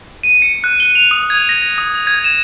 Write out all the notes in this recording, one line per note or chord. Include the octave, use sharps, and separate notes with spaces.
D#7
C#7
F#6
G7
F7
D#6
G#6
A#6
D#6
D#6
G#6
E7